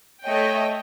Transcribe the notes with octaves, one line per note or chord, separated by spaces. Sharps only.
A3 C#5 D#5 G5